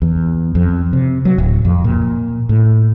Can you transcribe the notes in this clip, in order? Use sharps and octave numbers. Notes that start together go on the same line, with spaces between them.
E2
F2
C3
F#3
D1
F2
A#2
A2